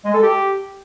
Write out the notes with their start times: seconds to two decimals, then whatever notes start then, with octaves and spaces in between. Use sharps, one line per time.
0.05 G#3
0.14 A4
0.23 G4